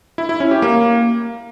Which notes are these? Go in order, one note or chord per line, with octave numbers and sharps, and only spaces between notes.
E4
E4
C#4
G4
A#3